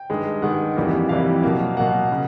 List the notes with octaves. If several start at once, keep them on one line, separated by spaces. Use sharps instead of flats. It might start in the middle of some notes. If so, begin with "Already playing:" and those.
Already playing: G5
G2 D#3 G#3
G2 D#3 G#3 F#5
F2 C3 E3 G3 A#3
F2 C3 E3 G3 A#3 F5
B2 F#3 A#3
B2 F#3 A#3 F#5
C#3